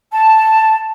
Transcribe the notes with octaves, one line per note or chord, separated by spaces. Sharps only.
A5